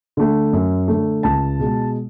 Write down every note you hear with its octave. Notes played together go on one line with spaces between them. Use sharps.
D3 A3
F#2
D3 A3
C#2 A5
B2 G#3